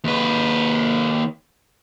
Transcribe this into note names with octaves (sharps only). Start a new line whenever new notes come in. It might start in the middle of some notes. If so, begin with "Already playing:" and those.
D#2 B4